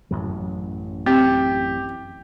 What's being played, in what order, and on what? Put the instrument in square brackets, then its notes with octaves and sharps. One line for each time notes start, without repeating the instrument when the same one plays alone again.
[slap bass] A1 F#2 F#3
[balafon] C4 [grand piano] G4